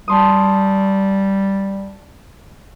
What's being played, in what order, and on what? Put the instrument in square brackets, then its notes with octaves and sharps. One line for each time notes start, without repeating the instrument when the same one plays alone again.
[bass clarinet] G3 [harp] A5 C6 D#6